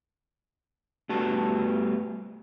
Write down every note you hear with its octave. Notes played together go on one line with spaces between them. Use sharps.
G3 A3 B3 F#4 A5